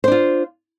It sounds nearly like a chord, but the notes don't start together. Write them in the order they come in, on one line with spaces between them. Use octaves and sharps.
C5 D4 F4